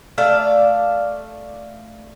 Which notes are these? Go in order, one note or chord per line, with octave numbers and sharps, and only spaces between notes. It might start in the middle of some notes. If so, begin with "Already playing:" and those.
A3 D5 F5 A5